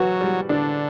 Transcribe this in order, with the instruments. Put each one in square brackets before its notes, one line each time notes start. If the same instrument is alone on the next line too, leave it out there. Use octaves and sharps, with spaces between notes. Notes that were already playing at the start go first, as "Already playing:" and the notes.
Already playing: [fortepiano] E3 F#4 [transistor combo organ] F#3
[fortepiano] G3
[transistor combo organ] D3 [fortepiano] D4